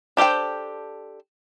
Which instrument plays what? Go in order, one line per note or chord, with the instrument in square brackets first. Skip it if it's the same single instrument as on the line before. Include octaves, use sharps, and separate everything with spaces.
[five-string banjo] D4 G4 A4 C5 G5